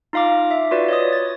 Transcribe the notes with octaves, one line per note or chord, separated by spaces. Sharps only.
D#4 F4 F5 A#5 D6
E5
F4 F#4 B4 D5
C#5 D#5 D#6
A6